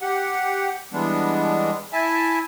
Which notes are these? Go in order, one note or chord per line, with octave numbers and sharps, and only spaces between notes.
G4 F#5
E3 G3 G#3 B3 D4
E4 E5 G#5 A5